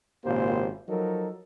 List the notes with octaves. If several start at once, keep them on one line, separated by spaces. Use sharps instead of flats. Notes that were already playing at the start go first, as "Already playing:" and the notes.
G#1 A#2 C#3 A#3 G4 C5
F3 F#3 D#4 A4 A#4